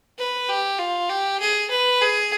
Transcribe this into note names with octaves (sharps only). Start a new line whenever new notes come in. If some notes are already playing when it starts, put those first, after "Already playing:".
B4
G4
F4
G4
G#4
B4
G#4